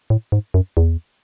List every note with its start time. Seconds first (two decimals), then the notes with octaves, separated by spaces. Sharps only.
0.10 A2
0.32 G#2
0.54 F#2
0.77 E2